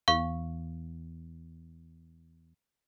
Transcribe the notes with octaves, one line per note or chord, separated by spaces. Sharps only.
E2 F5 C#6